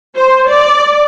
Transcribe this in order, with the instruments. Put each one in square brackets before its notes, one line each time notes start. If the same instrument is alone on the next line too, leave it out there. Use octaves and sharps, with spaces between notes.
[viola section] C5
D5